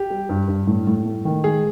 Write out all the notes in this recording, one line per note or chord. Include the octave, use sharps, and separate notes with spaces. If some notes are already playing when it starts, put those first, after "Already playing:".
Already playing: G4
G3
G2
G2
A2
A2
A3
D#3
G#3 G#4